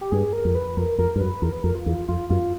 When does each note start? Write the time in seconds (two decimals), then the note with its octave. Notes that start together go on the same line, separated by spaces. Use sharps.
0.01 G4
0.11 G2 G#4
0.33 A#4
0.45 F2
0.55 B4
0.77 F2 A#4
0.98 F2 A#4
1.16 G2
1.20 F#2 B4
1.42 E2 A#4
1.52 B4
1.63 F2 A#4
1.75 F4
1.86 E2
2.08 F2 F4
2.30 F#2 F4